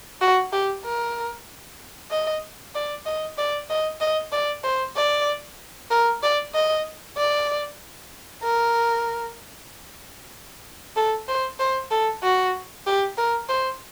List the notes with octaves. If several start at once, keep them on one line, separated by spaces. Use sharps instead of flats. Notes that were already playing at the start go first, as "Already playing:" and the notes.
F#4
G4
A#4
D#5
D5
D#5
D5
D#5
D#5
D5
C5
D5
A#4
D5
D#5
D5
A#4
A4
C5
C5
A4
F#4
G4
A#4
C5